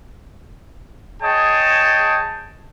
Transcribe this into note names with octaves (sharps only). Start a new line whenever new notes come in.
G#4 C#5 D#5 G5 A5